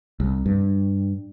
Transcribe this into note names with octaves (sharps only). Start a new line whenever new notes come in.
C2
G2